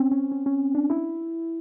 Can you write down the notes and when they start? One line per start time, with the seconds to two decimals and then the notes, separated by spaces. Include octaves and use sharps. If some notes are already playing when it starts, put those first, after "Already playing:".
Already playing: C4 C#4
0.11 C#4
0.32 C#4
0.46 C#4
0.75 D4
0.90 E4